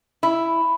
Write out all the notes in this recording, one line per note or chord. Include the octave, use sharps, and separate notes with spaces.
E4